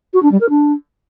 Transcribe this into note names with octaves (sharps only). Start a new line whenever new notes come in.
F#4
D4
G3
A#4
D4